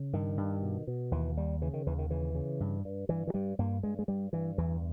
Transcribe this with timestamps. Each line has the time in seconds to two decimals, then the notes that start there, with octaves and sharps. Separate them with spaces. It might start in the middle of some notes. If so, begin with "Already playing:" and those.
Already playing: C#3
0.13 G2 D#3
0.37 G2
0.63 B2
0.87 B2
1.11 D#2 E3
1.37 D#2 G3
1.61 C#3 E3
1.74 D#3
1.86 D#2 E3
1.99 D#3
2.10 C#3 E3
2.35 C#3
2.60 G2
2.85 G2
3.09 G2 E3
3.27 E3
3.34 G2 G3
3.59 G2 A#3
3.83 G2 G#3
3.99 G#3
4.08 G2 G3
4.33 G2 E3
4.58 E2 E3